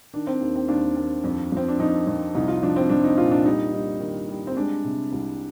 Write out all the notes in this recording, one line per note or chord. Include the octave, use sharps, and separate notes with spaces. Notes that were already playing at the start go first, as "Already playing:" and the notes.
D#3 D4
C4
D#2
C4
D#2 D4
D#2
F2
F3 C4
D4
F2 D#4
F2
C2 D#4
F4
F3 D4
C4
F3 D4
D#4
A#2 F4
D4
G3 D#4
G3 D#4
D#3
G3
C4
G#3 D4
C3
C2